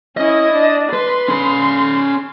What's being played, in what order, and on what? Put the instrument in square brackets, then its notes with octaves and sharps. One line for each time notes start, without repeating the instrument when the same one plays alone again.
[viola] C#4 E4 [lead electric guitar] D#5
[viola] D4
[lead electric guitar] B4 [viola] C6
[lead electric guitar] C#4 B5